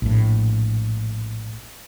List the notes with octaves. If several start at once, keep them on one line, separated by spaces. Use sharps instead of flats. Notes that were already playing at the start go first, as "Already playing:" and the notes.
A#1 A2